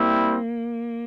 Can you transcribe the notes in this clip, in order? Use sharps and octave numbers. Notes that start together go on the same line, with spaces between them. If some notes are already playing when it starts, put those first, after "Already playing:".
Already playing: G3 A#3 C4 E4